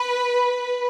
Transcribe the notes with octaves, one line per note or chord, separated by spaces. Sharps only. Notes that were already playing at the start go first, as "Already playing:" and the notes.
Already playing: B4